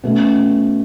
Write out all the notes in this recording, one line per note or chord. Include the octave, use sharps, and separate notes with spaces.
B2 A3 C#4